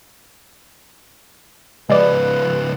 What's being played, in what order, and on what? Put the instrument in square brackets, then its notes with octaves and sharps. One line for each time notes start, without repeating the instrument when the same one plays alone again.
[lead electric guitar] C#2 F3 [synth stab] G#3 D5 [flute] B4